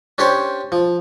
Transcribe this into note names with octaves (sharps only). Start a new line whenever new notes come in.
C#4 D4 G4 C5 C#5
F3